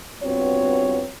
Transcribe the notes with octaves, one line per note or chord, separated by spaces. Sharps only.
G2 B3 C4 F4 F#4 C#5